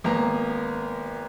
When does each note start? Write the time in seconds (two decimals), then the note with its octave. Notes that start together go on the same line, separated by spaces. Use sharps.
0.04 G#1 A#3 B3 A#5